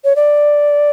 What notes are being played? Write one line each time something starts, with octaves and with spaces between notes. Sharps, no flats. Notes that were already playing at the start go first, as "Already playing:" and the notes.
C#5
D5